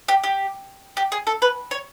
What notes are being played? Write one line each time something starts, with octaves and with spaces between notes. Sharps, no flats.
G4
G4
G4
G#4
A4
B4
C#5